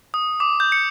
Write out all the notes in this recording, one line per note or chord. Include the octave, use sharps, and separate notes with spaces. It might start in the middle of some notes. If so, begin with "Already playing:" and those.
D#6
D6
G6
C#7